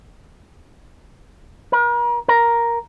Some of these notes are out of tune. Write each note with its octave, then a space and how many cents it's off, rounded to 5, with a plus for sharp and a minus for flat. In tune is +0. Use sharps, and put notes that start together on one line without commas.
A#4 +40
A#4 +5